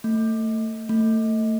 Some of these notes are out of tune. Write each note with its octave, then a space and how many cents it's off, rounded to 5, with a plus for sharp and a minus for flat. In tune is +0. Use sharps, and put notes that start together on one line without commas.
A3 +25
A3 +25